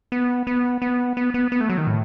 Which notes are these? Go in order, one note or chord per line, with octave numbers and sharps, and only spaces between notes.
B3
B3
B3
B3
B3
B3
A3
F#3
D#3
A2